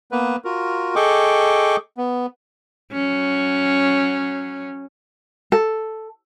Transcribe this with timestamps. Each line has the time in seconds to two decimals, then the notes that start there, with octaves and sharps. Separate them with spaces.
0.12 A#3 B3 B4
0.45 F4 F#4 A#4
0.95 G#4 A4 D#5 G5 C#6 D6
1.97 B3
2.92 F#3 C#4
5.52 A4